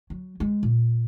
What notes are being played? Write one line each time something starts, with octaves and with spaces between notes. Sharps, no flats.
F#3
G#3
A#2